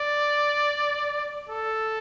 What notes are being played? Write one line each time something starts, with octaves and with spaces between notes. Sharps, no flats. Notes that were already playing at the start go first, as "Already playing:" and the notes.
Already playing: D5
A4